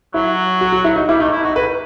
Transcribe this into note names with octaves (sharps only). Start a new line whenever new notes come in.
F#3 E4
F#4
F#4
E4
D#4
G3 E4
A3 D#4
E4
D#4 F#4
B4